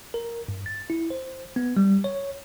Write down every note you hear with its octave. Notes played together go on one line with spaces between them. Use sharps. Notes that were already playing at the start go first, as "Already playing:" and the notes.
A#4
G2
A6
E4
C5
B3
G3
C#5